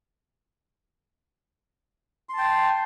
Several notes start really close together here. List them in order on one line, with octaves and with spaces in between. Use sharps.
C6 A5 G5